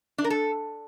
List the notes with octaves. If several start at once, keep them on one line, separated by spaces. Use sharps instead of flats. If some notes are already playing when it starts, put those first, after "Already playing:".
D4
A#4
A4